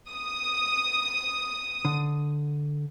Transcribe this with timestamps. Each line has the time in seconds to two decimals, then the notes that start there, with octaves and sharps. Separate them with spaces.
0.11 D#6
1.85 D3